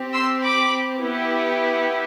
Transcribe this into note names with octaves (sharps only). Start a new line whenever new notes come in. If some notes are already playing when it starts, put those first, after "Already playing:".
Already playing: C4 G4
C6 E6
B5 D6
B3 E4 G4